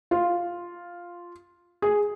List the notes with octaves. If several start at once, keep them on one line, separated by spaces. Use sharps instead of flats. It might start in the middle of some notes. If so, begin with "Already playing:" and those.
F4
G#4